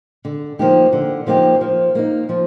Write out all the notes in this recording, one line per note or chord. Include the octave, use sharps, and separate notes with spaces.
D3
F3 A#3 D#4 G4
D3
F3 A#3 D#4 G4
F3
A#3 D#4
F3